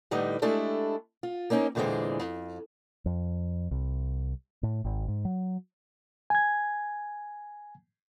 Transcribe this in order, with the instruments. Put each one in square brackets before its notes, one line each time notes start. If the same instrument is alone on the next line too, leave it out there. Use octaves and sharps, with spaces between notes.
[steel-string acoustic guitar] A2 D3 G3 D#4 B4 D#5
G#3 A3 D4 E4 G4 A4
F4
A#3 C4 C#4 D#4
E2 A#2 D3 E3 G#3 C4
F2
[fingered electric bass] F2
C2
A2
G#1
G#2
F#3
[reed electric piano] G#5 G#6